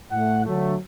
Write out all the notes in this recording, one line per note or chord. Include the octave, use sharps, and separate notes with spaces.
A2 A3 F#5
D3 F#3 A3